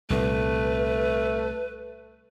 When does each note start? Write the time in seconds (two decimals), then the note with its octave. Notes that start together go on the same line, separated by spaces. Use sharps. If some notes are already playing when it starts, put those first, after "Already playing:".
0.10 C2 A#2 A3 B4